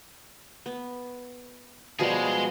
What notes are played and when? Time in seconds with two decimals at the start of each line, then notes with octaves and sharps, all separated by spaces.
0.66 B3
1.99 B2 F3 G3 G#3 G#4